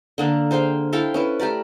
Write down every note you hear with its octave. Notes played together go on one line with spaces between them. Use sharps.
D3 A#3 D4
G#4 C5 F5 G5
E4 A4 F5 G5
C#4 E4 B4
A3 G4 A#4 D5